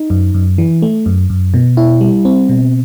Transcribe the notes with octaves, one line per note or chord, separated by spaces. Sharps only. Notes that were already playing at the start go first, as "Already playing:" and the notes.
Already playing: D#4
F#2
F#2
E3
A3
F#2
F#2
B2
E4
G3
C4
B2